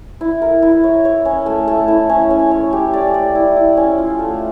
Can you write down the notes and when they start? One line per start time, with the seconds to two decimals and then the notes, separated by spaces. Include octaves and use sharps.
0.21 E4
0.42 A#4
0.62 E4
0.84 C#5
1.05 C#5
1.25 C#4
1.46 A3
1.68 A3
1.88 E4
2.09 C#4
2.30 C#4
2.51 C#5
2.73 G4
2.93 D5
3.14 D5
3.35 E4
3.56 E4
3.77 C#4
3.98 F4
4.19 A3